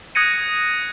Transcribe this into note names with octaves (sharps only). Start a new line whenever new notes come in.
D#6 F#6 G#6 A#6 C#7 D#7